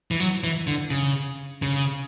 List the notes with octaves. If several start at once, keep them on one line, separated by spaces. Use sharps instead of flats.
E3
F#3
E3
D3
C#3
C#3